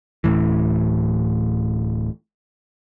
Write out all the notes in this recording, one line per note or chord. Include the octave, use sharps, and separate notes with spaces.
D1 A2 E3